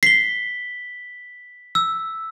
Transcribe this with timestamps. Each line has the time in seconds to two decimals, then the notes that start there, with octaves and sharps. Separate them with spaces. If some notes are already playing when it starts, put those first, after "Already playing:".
0.03 B6 C7 G7
1.75 E6